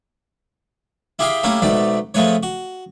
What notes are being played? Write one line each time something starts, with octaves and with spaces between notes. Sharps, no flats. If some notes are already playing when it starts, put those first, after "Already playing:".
E4 G4 G#4 F5 G5 B5
A3 A#3 C#4 E4 G4
G#2 B2 A3 D5 B5
F3 G#3 A3 B4 C#5
F#4